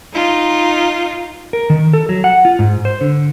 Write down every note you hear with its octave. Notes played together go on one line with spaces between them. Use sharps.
D#4 F4
A#4
D#3
A4
F#3
F#5
F4
G#2
C5
D3